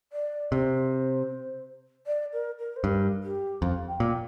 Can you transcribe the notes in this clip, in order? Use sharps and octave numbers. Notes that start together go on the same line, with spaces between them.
D5
C3 C5
D5
A#4
A#4
C5
G2 A#4
G4
F2 F5
G5
A#2